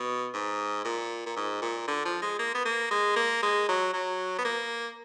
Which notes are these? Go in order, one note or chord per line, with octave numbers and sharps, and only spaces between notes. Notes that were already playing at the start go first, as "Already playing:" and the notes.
Already playing: B2
G#2
A#2
A#2
G#2
A#2
D3
F3
G#3
A#3
B3
A#3
G#3
A#3
G#3
F#3
F#3
B3
A#3